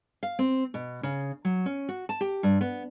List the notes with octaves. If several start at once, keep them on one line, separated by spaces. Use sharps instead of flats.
F5
C4
B2
C#3
F#3
C#4
F#4
A5
G4
G2
B3